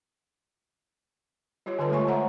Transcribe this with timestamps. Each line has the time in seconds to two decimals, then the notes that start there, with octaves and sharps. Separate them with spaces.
1.66 G3 F4 G4 C#5
1.79 D3 F4 A4 B4 A5
1.90 G#3 A3 C#5 G#5 C#6
2.07 C5 C#5 E5 F#5 A#5 C#6